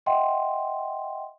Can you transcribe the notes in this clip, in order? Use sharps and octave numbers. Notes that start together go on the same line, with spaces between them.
D#5 E5 F#5 G5 C6